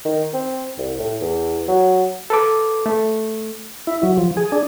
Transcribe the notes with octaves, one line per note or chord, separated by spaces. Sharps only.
D#3
C4
C2
A2
E2
F#3
A4 B4 D6
A3
E4
F#3
F3
G#4
D4